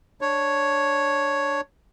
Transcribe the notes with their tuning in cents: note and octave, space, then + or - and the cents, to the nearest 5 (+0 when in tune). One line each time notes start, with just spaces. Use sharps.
D4 +0 C#5 +0